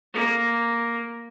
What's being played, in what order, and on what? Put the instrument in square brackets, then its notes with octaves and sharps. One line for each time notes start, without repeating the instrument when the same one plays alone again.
[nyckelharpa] A#3